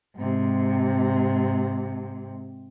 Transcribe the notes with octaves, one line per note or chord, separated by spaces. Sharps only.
G#2 C3